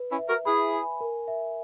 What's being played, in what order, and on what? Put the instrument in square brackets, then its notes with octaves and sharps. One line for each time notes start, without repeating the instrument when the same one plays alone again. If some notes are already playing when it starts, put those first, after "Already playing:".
Already playing: [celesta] B4
[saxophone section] C#4 E4
[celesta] E5
[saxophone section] F#4 A#4
[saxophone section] E4 G#4 [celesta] B5
[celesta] G#5
A#4
E5